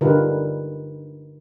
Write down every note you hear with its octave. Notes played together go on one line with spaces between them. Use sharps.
D3 D#4 F4 G4 A#4 B4